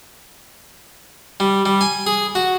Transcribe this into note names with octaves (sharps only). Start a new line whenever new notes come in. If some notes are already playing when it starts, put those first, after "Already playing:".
G3
G3
G#5
G#4
F#4